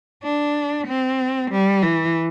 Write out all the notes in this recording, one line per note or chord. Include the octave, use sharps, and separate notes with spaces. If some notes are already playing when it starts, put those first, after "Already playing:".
D4
C4
G3
E3